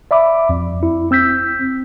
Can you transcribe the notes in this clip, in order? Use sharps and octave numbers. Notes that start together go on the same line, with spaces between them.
D5 E5 B5 D6
F2
E4
C4 E6 G6 B6